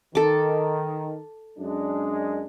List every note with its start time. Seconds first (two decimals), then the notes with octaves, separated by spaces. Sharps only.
0.15 D#3 A4 D6
1.59 F#2 G#3 D4